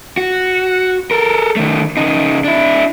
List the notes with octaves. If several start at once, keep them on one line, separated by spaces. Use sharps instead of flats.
F#4
A4 A#4
D#3 A3
C#3 D#4
D4 E4